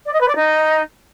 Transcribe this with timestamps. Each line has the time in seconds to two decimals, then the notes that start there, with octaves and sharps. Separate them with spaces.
0.06 D5
0.13 D#5
0.21 B4
0.28 D5
0.36 D#4